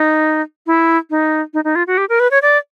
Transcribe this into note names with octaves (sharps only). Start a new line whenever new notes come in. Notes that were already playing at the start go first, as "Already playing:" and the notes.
Already playing: D#4
E4
D#4
D#4
D#4
F4
F#4
G4
A#4
B4
C#5
D5